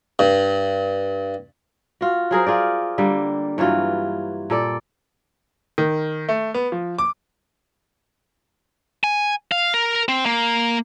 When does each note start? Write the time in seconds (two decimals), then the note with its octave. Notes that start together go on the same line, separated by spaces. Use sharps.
0.19 G2
2.01 F4 F#4
2.31 F#3 G#4 A#4 C5
2.47 F4 G#4 D5
2.98 D3 G3 A#3
3.58 G2 E3 F#3 F4
4.50 A#2 A4 D5
5.78 D#3
6.29 A3
6.54 B3
6.72 F3
6.98 D6
9.04 G#5
9.52 F5
9.74 A#4
10.09 C4
10.26 A#3